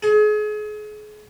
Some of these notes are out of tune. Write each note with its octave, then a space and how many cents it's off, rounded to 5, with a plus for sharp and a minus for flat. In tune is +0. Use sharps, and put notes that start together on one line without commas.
G#4 +35